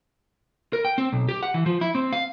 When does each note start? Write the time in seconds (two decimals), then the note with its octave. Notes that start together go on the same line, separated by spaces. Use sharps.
0.73 A#4
0.85 G5
0.98 C4
1.13 B1
1.29 G4
1.43 F#5
1.54 E3
1.66 F3
1.81 E4
1.95 C4
2.13 F5